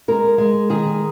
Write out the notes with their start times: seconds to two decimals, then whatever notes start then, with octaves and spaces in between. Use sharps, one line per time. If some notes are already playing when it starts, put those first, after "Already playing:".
0.08 G#3 A#4
0.38 G#3
0.70 D#3 G#4